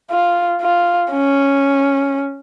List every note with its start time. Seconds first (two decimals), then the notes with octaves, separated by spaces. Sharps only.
0.11 F4
0.62 F4
1.12 C#4